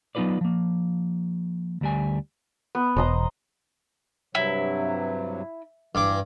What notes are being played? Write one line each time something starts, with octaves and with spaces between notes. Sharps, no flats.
F#3 B3 D#4 F4 B4 D5
F3 A#3
D2 G3 G#5
B3
E1 C5 D#5 A#5
G2 C3 F#3 E4
G2 E3 D6